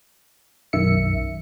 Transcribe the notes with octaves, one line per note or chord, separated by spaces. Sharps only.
B1 F#2 D#3 E5 C#7